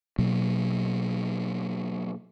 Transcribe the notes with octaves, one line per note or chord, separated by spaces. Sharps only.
B2 F#3 A#3